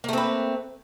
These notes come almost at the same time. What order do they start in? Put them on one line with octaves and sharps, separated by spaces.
A#3 A3 C4 B4